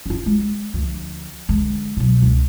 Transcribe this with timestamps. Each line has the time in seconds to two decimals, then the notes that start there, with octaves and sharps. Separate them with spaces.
0.06 C#4 F4
0.26 G#3
0.74 D2 F3
1.49 D3 G#3
1.97 B2 F#3
2.22 C#2